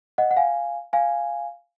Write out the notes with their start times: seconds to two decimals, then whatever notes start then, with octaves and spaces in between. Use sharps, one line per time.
0.18 D#5 F#5
0.31 F#5
0.37 F5 G#5
0.93 F5 G#5